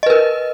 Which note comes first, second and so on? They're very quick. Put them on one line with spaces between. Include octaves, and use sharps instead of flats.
D#5 B4 A#4